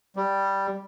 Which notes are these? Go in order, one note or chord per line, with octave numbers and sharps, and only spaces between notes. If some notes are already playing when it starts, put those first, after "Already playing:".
G3